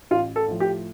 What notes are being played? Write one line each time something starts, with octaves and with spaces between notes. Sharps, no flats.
A1 F4
A4
A2 F3
G4